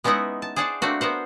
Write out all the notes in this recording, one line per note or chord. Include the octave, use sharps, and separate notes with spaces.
G#3 B3 C#4 D#4 E4 F#5
A5
G#4 C5 D5 F#5 G5 A5
A3 A#3 C4 D4 F#4
B3 A#4 C5 F#5